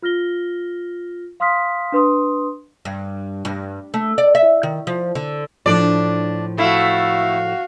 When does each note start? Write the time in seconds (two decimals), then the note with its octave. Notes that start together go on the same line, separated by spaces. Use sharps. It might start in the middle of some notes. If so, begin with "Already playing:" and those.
0.02 F4 F6 A#6 G7
1.40 F5 C6 D#6 F6 B6
1.92 D4 B4 C6 D#6
2.85 G2
3.45 G2
3.94 A3
4.18 D5
4.35 E5
4.63 D#3
4.87 F3
5.15 D3
5.66 A2 F3 D4 D5
6.58 A3 E4 F#4 F5